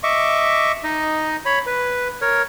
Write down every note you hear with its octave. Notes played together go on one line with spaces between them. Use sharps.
D#5 E5 C#6 D6
D#4 D#5
C#5 B5
B4
A#4 C#5